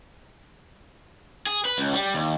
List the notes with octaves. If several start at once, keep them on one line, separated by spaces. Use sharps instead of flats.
G#4
B4
C#2
G3
D#2